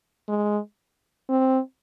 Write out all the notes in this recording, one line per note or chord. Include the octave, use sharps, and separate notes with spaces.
G#3
C4